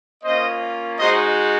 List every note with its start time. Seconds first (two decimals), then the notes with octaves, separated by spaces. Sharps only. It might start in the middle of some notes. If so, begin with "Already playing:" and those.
0.24 A#3 C#4 F4 C5 D#5
0.99 G#3 D#4 F#4 C5 D#5